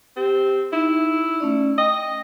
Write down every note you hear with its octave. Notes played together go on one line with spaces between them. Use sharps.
C4 G4
D#4 E4
A3 C#4 D5
D#5 G5